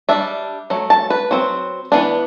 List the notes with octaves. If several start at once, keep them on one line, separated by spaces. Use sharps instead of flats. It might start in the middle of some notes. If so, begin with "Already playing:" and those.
G3 D4 E5
F#3 A3
A5
B4
F#3 C4
E3 B3 D4